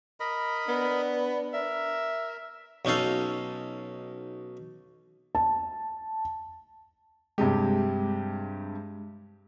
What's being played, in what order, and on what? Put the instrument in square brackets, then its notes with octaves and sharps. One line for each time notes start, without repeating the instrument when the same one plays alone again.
[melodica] A#4 D#5 B5
[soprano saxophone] B3 [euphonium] D4
[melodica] A#4 [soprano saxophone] E5
[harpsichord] B1 C#4 D#4 A4 F5
[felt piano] A5
[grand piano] G2 C3 G4 [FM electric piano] G#3